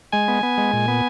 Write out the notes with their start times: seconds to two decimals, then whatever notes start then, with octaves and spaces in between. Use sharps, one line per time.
0.12 G#3 G#5
0.28 B3
0.43 B3
0.58 G#3
0.73 A#2
0.88 B3